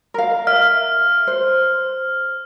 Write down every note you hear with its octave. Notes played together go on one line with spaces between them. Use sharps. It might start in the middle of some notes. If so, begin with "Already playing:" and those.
A#4 F5
E5 F6
C5